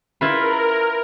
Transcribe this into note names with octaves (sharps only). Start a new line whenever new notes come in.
E4 F4 A#4 B4